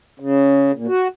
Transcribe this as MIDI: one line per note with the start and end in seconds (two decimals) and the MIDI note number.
0.20 0.71 49
0.75 0.87 46
0.87 1.08 66